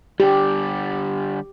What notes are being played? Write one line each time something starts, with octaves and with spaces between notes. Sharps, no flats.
D3 G3 G4